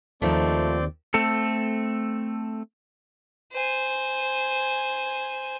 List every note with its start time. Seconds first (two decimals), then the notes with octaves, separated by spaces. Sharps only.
0.22 D#2 D#3 F3 A3 C4 D5
1.14 A3 C4 A4
3.52 C5 G#5